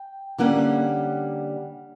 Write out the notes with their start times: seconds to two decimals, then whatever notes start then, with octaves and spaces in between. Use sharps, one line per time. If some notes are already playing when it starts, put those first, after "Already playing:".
Already playing: G5
0.38 D3 G3 A#3 C#4 F#5